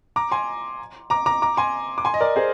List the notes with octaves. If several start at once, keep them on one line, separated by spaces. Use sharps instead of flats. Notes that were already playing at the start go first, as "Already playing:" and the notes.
A#5 D6
G#5 C6
A#5 D6
A#5 D6
A#5 D6
G#5 C6
D6
G#5 C6
D#5
A#4 D5
G#4 C5